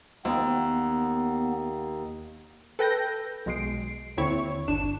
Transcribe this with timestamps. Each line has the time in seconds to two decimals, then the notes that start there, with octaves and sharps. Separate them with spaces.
0.25 D#2 B3
2.79 A4 B4 G5 G6 A#6
3.46 B1 B2 G#3 C7 D7
4.17 D#2 D3 C4 E4 C#5 C#6
4.68 G1 D4 E7